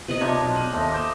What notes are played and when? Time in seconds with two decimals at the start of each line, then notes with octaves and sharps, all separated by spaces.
0.08 C3 B4 D#5
0.21 C3 F3 D4 D#4 C#5 E5
0.41 B1 C4
0.56 C3 F5 D#7 F#7
0.73 D#2 A3 C4 D#5
0.92 D6 D#6 G6 E7